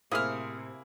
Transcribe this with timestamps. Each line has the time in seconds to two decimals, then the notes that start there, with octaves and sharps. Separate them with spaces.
0.12 A2 C3 A#3 E4 G#4 C5 D#6 F6